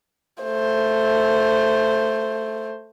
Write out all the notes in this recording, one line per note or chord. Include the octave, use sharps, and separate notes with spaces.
A3 C5